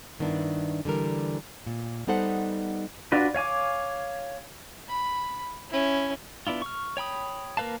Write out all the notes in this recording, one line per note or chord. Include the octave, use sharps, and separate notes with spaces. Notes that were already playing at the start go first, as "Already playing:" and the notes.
G2 D#3 B3 D4 E4
D3 E3 G3 A#4
A#2
G3 B3 D#4 A4 C5 F#5
D4 F4 F#4 B4
C#5 F5 G#5 D6
B5
C#4 E4
B3 D4 E4 F4
C#6 F6
C#5 G5 B5 D#6
A#3 A#4 B4 F5 A5